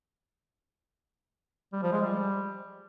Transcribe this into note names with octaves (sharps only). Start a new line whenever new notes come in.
G3
F3
G#3
G3